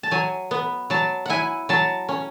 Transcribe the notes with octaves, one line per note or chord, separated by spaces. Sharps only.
A5
F#3 G#5
B3
F#3 A5
E4 F#5 G#5
F#3 A5
C#4